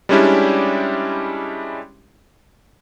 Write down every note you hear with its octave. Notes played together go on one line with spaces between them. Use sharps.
G3 G#3 C#4 D4 E4 G4